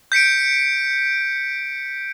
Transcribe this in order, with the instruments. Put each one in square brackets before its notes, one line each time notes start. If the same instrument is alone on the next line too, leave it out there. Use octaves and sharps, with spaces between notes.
[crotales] G6 B6 C#7 D7